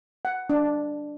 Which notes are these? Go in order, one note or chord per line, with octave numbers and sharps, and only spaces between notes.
F#5
D4